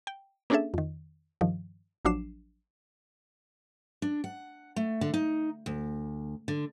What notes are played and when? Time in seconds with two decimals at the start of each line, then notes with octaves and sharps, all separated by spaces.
0.07 G5
0.50 A#3 C#4 D4 G#4 A4 E5
0.74 F2 D#3
1.41 G2 D#3 F3
2.05 A1 F3 F#3 D4 C7 E7
4.02 D4
4.24 F#5
4.76 A3
5.01 D3
5.14 D#4
5.66 D2
6.48 D3